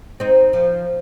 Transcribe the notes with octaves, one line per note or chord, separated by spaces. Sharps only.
C4 D#4
F3